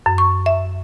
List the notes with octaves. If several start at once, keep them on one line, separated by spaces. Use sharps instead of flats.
F#2
C#6
E5